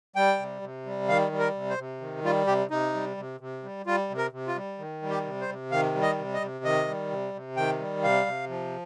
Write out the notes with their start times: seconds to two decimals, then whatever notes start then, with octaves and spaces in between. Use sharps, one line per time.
0.16 G3 G5
0.39 C3
0.62 C3
0.86 G3
1.08 D#3 F5
1.32 G3
1.39 A#4
1.55 C3
1.70 C5
1.79 C3
2.01 D#3
2.24 G3 F4
2.47 C3 G4
2.71 C3 D#4
2.94 G3
3.17 C3
3.40 C3
3.63 G3
3.86 G3 F4
4.10 C3
4.17 A#4
4.32 C3
4.47 F4
4.56 G3
4.79 D#3
5.02 G3
5.10 G4
5.25 C3
5.41 C5
5.49 C3
5.71 D#3 F5
5.95 G3
6.02 D#5
6.18 C3
6.34 D#5
6.41 C3
6.64 D#3 D#5
6.88 G3
7.11 C3
7.34 C3
7.57 D#3 G5
7.79 G3
8.03 C3 F5
8.26 C3
8.49 F3